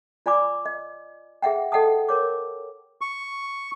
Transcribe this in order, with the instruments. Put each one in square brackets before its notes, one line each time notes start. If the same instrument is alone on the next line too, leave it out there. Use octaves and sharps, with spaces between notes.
[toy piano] F4 D5 G#5 B5 D6
D#5
G#4 E5 F#5 G5
A4 D#5 F#5 G5 A5 D#6
A#4 C#5 D6
[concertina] C#6